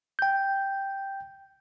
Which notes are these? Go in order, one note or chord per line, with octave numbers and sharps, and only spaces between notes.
G5 G6